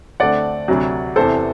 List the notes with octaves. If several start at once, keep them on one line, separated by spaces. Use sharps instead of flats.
D2 D3 A3 C4 D5 F#5
D2 C3 F#3
E2 C3 E3 A4 C5